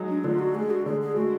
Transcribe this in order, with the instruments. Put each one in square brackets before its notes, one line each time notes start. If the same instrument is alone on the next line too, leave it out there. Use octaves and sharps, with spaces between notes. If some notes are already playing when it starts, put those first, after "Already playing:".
Already playing: [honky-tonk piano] F#3 G#3 D#4
[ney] D4
[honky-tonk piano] D3 [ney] F4
[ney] F#4
[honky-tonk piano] G#3 [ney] G#4
[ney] F#4
[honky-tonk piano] D3 [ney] G#4
[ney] G#4
[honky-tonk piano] G#3 [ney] F#4